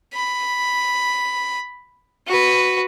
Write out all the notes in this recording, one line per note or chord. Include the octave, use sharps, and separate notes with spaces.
B5
F#4 B4